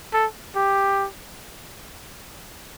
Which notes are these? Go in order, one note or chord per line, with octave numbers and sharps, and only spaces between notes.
A4
G4